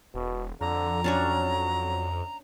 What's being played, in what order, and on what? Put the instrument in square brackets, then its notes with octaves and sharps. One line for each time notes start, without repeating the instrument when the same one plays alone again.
[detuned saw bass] E1 [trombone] B2
[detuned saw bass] F2 [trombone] D3 [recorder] A#5
[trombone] F#3 [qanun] C#4 D4 C#5